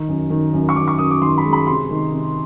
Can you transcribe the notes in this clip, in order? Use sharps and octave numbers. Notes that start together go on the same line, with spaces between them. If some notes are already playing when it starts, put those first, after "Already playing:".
Already playing: D#3
F#2
D#3
F#2
C#6
D#3 D6
C#6
F#2 D#6
D6
D#3 C6
B5
G#3
B5
C3 C6
D#3
C3